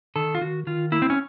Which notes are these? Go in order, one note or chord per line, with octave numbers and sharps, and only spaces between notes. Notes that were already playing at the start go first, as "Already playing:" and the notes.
D#3 A4
F4
D#3 F#4
D#3 F4
A#3 E4
C4
C#4